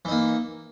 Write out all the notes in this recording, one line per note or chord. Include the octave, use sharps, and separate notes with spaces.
E3 A#3 D#4